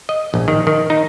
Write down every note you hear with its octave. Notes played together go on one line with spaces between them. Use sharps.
D#5
A#1
D#3
D#3
D#4